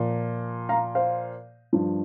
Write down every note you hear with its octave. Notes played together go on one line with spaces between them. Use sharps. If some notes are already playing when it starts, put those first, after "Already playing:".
Already playing: A#2 F3
F5 A#5
C5 F5
G2 F3